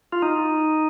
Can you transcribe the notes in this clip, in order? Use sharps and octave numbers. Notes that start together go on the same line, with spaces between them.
F4
D#4